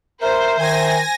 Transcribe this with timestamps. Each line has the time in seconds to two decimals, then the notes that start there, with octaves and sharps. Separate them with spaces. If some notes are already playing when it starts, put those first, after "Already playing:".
0.22 A#4 C5 E5
0.59 D#3 G#5 A#6